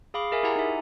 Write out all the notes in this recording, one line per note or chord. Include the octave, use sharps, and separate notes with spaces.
G#4 F5 B5 D6
G#4 A#4 E5 G#5
E4 G4 F#5 G#5 A#5
D#4 E5